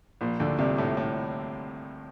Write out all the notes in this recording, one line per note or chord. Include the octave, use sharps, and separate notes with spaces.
A#1 A#2
D2 D3
C2 C3
A2
A2